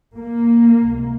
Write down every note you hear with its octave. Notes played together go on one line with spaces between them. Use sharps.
A#3
C#2 C3